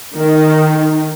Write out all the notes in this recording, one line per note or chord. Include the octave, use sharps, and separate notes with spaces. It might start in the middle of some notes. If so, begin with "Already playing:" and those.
D#3